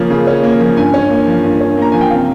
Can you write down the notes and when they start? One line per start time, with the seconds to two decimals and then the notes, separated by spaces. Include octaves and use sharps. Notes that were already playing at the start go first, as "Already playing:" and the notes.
Already playing: C#3 F3 A#3 C#4
0.10 C#3
0.27 C#4
0.44 A#3
0.60 F3
0.77 G2 G#5
0.94 C#4
1.10 A#3
1.27 F3
1.44 G2
1.61 C#4
1.77 A#3 A#5
1.92 F3 G#5
2.01 G5
2.10 C3 F5